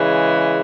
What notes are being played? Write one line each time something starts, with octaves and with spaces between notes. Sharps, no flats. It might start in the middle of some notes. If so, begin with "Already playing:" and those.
Already playing: C#3 E3 G#3